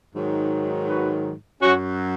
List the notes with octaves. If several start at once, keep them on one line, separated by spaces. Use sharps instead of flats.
G#2 D#3 F#3
F#4 B4
F#2 F#3 C#4 F#4